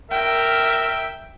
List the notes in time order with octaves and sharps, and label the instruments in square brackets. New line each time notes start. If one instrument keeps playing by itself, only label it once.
[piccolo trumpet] A#4 [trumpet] E5 [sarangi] G5